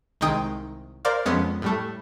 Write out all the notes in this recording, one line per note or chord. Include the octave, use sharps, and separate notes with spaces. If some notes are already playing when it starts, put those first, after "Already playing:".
C2 D#3 G#3 D#4 G5 D#6
A#4 C5 D5 F5
F2 G#3 B3 C#4
A2 G3 A3